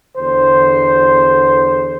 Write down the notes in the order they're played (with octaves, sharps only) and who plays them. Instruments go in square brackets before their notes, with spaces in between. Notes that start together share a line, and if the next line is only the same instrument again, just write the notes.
[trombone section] E2 D3 C5